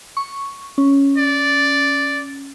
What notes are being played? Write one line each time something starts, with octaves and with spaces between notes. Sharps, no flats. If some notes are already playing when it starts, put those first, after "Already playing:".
C#6
C#4
D5